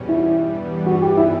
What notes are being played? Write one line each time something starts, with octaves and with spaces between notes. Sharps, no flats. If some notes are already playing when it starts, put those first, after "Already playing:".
Already playing: E2 B2 G3 C#4
E4
G2 E3 G3 B3
F#4
G4
E4